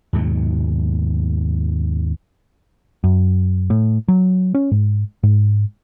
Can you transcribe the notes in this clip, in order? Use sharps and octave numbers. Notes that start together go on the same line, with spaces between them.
D#2 G#2 B2 F#3
F#2
A2
F#3
C#4
G#2
G#2